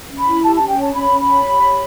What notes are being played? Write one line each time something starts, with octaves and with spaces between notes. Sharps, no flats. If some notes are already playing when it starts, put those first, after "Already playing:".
C#4
B5
E4
G4 A5
C#4 A5
G5
C#5 A5
C#4 B5
C#4
B5
C#5
G4
C#5